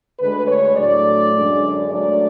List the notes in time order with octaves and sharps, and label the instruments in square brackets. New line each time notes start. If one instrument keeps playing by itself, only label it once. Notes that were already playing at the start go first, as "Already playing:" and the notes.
[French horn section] D2 D3 G#3 B4
C#5
A2 F#3 A3 D4 D5
F#2 D3 G#3 D4
G#2 F#3 A3 D4 D5